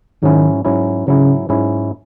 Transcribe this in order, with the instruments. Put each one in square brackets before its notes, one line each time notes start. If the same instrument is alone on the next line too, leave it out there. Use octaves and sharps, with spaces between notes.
[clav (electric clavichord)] G#2 F#3 C#4 E4 [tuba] D#3
[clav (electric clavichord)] G#2 F#3 C#4 E4
[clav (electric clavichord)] G#2 F#3 C#4 E4 [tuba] C#3
[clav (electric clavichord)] G#2 F#3 C#4 E4